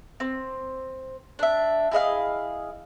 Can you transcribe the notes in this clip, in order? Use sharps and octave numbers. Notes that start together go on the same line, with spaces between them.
C4
D4 E5
E4 G#4 D#5 F5